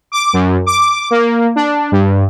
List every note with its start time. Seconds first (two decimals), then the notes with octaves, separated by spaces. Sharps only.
0.12 D6
0.33 F#2
0.66 D6
1.11 A#3
1.56 D4
1.92 G2